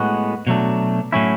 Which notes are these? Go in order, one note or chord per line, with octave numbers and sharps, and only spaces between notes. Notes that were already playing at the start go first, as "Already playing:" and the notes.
Already playing: A2 G#3 B3 F#4
B2 F#3 A3 D4
A2 F#3 C#4 E4